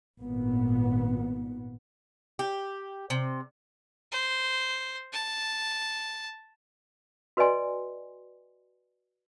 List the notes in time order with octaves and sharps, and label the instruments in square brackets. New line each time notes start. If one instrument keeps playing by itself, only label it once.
[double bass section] G#1 A#2 B3
[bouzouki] G4
C3
[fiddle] C5
A5
[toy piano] F#4 B4 D5 D#5 G#5 C6